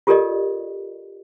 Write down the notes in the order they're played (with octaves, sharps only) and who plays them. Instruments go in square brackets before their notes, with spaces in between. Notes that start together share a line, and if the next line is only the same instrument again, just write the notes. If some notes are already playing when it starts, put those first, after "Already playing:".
[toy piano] F4 G4 A4 A#4 D5 D#5